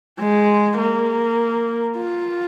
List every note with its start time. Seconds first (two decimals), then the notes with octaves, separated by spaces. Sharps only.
0.19 G#3
0.78 A#3
1.97 F4